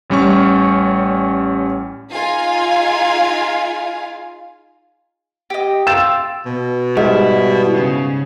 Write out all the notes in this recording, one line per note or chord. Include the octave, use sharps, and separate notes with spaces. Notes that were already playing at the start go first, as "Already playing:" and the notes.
A1 G3 C#4 C#6
D#4 F4 G#4 F5 G#5
G4 D#5
F4 G5 E6 G6 A6 E7
B2
G#2 G3 E4
C#3